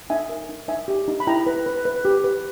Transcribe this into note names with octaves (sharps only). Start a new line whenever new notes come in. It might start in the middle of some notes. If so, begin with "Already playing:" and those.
D#4 E5 G#5
A#4
D#4
D#4 E5 G#5
G4
D#4
B5
E4 G5 A#5
B4
B4
B4
G4
B4